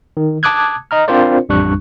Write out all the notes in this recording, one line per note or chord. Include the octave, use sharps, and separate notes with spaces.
D#3
A5 D6 D#6 F#6 G#6
D#5 A#5 F6
C4 D4 F4 A#4 C5 D5
A1 F2 G3 D4 C#6 F#6